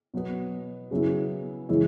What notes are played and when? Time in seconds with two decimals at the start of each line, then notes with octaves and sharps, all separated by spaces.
0.14 B2 F#3 B3
0.91 C#3 F#3 B3 E4
1.69 C#3 E3 G#3 C#4 E4